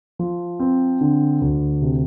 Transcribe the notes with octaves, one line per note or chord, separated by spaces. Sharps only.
F3
C4
D3
D2
C3